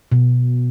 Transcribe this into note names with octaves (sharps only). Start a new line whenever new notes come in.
B2